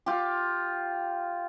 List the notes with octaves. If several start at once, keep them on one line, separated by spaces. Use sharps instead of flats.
F4 G4